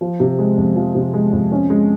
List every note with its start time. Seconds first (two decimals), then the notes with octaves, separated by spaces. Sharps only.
0.01 F3
0.20 C3
0.39 G#3
0.57 F2
0.76 F3
0.95 C3
1.14 G#3
1.32 F2
1.52 C#4
1.70 G#3